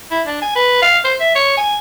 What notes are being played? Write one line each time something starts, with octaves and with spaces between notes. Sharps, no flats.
E4
D4
G#5
B4
F5
C5
E5
C#5
G#5